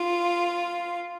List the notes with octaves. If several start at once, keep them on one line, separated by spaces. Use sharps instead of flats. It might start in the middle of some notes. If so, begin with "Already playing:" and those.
Already playing: F4